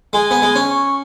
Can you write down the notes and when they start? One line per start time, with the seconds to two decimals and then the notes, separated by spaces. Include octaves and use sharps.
0.13 G#3 G#5
0.31 B3
0.42 G#3
0.55 C#4
0.69 C#6